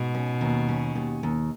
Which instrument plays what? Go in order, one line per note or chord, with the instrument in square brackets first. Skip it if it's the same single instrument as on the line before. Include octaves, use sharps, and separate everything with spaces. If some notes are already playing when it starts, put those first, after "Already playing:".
Already playing: [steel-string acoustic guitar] G#2 [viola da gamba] B2
[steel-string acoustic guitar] C#4
D#2
C#4
D#2
D#2